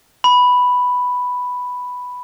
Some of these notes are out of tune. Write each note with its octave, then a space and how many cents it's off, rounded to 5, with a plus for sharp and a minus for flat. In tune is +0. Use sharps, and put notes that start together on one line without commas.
B5 +0